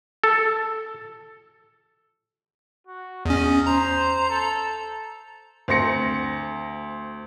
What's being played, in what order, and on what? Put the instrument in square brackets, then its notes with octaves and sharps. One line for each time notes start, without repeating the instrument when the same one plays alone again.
[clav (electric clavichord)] A4
[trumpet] F#4
[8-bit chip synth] E2 C#4 [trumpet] D#5
[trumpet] C5 [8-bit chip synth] A#5
[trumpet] A4
[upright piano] D2 C4 C6 A#6 C#7